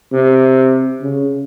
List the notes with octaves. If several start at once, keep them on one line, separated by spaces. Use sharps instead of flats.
C3
C#3